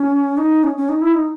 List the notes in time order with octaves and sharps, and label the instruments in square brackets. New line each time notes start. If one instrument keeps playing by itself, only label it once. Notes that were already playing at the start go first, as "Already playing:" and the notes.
Already playing: [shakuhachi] C#4
D#4
C#4
C#4
D#4
E4
D#4